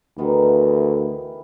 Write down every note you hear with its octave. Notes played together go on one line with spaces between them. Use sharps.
D2 D#3 E3 B3